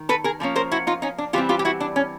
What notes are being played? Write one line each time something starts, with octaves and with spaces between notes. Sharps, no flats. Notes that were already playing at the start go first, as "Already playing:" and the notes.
Already playing: D#3
A4 B4
G#4 A#4
D3 F3 A#3 C#4
A#4 C5
E4 F#4
D#4 F4
C#4 D#4
D4
E3 G3 C4 F4 G4
F4 G4
G4
E4 F#4
D4
C#4